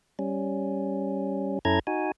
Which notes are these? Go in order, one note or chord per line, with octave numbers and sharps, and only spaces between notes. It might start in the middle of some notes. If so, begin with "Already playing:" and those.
G3 C#4
F#2 C#4 E4 A4 A#5 G#6
D#4 F#4 G#5